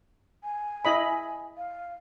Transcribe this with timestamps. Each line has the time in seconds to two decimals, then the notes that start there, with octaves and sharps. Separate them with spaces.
0.44 G#5
0.85 E4 D#5 B5
1.57 F5